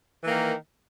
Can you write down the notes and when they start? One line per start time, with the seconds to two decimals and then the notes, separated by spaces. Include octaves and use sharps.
0.23 E3
0.26 A#3
0.29 D#3